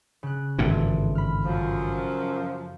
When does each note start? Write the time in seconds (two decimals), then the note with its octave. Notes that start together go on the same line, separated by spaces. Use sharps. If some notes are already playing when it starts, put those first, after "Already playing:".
0.23 C#3 F#6
0.59 G#1 G2 A#2 E3 F3 A4
1.15 B5 F6
1.45 F#2 F3